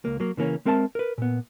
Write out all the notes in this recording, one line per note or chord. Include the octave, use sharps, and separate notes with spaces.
C#2 A#3
F#3 A#3
C#3 E3 A#3 C#4
G#3 C4 A#4 E5 A5
A#4 B4
A#2 B3